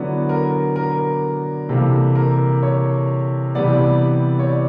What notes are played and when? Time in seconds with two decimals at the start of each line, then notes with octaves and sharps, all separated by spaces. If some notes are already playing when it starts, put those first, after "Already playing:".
Already playing: D3 F#3 B3 E4 D5
0.29 A#4
0.76 A#4
1.69 C3 E3 G3 A#3 A4
2.16 A#4
2.63 C#5
3.55 C3 E3 G3 B3 D5
4.39 C#5
4.49 D5